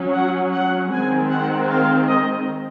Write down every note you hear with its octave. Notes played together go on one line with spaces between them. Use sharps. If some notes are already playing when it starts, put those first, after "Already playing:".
Already playing: F#3 C#4
F#5
F#5
D#3 G#3 C4 G#5
F#5
F5
D#5